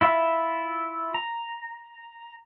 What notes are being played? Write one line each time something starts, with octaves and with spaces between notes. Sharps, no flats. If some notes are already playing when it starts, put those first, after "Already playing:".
E4 F4 E5
A#5